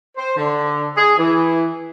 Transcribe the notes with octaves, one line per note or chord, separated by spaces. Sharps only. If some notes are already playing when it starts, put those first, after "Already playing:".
C5
D3
G#4
E3